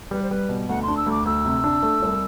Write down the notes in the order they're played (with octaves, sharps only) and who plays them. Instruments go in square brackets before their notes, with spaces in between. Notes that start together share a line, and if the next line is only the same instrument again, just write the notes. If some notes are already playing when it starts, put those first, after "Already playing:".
[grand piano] G3 [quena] B4
[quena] C5
[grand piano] G3 [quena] B4
[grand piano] B2
[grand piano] D2 [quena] F#5
[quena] C6
[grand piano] D4
[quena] E6
[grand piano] D2
[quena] D6
[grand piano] D2 [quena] E6
[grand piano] C3
D4
A3
C2